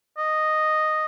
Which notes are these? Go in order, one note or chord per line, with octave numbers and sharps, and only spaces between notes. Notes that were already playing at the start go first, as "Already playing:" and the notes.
D#5